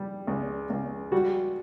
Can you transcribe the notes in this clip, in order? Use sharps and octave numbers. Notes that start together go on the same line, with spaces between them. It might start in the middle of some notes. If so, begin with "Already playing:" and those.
Already playing: G3
C#2
C#2
G3 F#4